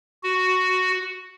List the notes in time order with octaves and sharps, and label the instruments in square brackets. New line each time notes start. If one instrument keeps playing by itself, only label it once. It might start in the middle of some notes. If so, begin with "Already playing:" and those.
[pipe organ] F#4